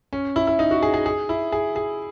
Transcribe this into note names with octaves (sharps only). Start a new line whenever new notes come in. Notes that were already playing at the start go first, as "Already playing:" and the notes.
C#4
E4
E4
D#4
F#4
G#4
G#4
G#4
E4
G#4
G#4